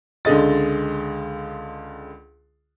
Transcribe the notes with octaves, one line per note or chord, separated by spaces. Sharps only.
C#2 D3 G#3 D#5 A6